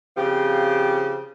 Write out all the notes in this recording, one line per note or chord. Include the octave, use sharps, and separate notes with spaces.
C#3 F3 C4 G4